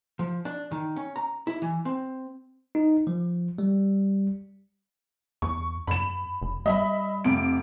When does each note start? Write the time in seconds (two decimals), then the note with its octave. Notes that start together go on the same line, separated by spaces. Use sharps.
0.19 F3
0.45 D4
0.71 D#3
0.96 C#4
1.16 A#5
1.47 E4
1.62 E3
1.85 C4
2.75 D#4
3.07 F3
3.58 G3
5.42 E2 C#6
5.87 F#2 B5 E7
6.42 F1
6.66 G3 D#5 E5 B5
7.24 F1 C3 D7